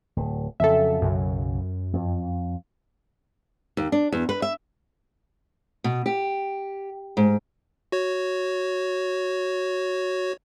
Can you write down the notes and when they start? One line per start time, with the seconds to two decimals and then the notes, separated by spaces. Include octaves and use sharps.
0.17 D1
0.60 F2 C#3 F#3 A4 E5
1.02 B1 F#2 C#3 F#3
1.93 F2
3.77 D#2
3.92 D4
4.12 E2
4.29 B4
4.42 E5
5.84 B2
6.06 G4
7.17 G#2
7.92 F#4 C#5